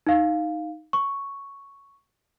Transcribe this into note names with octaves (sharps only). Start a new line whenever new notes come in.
D#4 F5
C#6